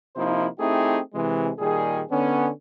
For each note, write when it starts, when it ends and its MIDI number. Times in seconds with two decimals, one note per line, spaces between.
0.16 0.46 48
0.16 0.46 53
0.16 0.46 58
0.16 0.46 63
0.16 0.46 64
0.16 0.46 72
0.59 0.99 57
0.59 0.99 60
0.59 0.99 63
0.59 0.99 64
0.59 0.99 67
0.59 0.99 68
1.14 1.50 48
1.14 1.50 52
1.14 1.50 56
1.59 2.01 46
1.59 2.01 51
1.59 2.01 55
1.59 2.01 68
2.11 2.50 50
2.11 2.50 59
2.11 2.50 61